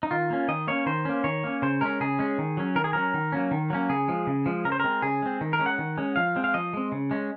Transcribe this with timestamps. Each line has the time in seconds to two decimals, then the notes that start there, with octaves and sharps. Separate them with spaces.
0.03 D#4
0.11 D#3 F4
0.30 A#3 C#4
0.48 D#3 D#5
0.67 A#3 C#4 C#5
0.86 D#3 C5
1.05 A#3 C#4
1.24 D#3 C#5
1.44 A#3 C#4
1.62 C#3 C5
1.81 G#3 C#4 A#4
2.00 C#3 G#4
2.19 G#3 C#4
2.38 D#3
2.57 F#3 C#4
2.76 D#3 A#4
2.84 G#4
2.93 F#3 C#4 A#4
3.14 D#3
3.32 F#3 A#3 C#4
3.51 D#3
3.70 F#3 A#3 C#4
3.89 C#3 G#4
4.08 F3 G#3
4.27 C#3
4.46 F3 G#3
4.65 C#3 A#4
4.72 C5
4.80 G#3 C4 A#4
5.02 C#3 G#4
5.22 G#3 C4
5.41 D#3
5.53 A#4
5.59 G#3 C#4
5.66 F#5
5.79 D#3
5.98 G#3 C#4
6.16 F3 F5
6.36 G#3 C4
6.44 F5
6.54 F3 D#5
6.74 G#3 C4
6.92 C#3
7.11 G#3 C#4